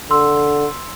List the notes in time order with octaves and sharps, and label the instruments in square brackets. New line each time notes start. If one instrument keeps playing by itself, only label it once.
[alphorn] D3 [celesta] C6 E6